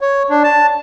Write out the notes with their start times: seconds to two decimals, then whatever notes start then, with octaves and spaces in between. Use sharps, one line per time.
0.01 C#5
0.30 D4
0.44 A5